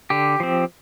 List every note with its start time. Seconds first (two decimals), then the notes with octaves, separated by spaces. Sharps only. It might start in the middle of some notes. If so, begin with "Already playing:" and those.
0.10 D3 G4
0.40 F3 C4